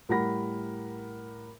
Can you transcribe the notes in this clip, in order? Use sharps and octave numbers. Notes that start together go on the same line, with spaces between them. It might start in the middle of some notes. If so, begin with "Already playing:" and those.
A2 G3 A#4 F#5 B5 A#6